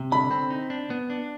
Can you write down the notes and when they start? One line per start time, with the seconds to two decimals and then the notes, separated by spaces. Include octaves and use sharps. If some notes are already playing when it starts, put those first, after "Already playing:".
Already playing: C3
0.12 D3 B5
0.31 C4
0.50 D#4
0.70 D4
0.90 B3
1.10 D4